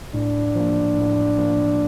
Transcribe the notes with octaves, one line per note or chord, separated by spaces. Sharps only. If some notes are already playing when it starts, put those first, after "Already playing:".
A2 D4
F3 A#3
A2
F3 A#3